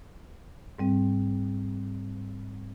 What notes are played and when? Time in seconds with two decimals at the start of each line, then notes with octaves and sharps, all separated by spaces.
0.79 G#2 G3 C4